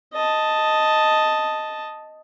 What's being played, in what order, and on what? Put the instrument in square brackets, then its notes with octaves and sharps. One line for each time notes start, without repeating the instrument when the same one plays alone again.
[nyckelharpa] D#5 A5